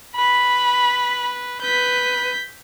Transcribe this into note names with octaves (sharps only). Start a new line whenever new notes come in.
B4 B5
B4 G6 B6